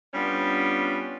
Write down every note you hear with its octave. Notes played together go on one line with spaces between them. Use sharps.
G3 B3 C#4 D4 F4